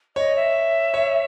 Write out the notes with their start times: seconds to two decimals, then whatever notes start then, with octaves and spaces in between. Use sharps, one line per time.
0.16 C#5 D#5
0.36 E5
0.94 C#5